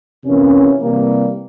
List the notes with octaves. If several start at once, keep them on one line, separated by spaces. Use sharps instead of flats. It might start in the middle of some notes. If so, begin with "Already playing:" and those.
F2 C3 E3 A#3 C#4
C3 E3 G3 A#3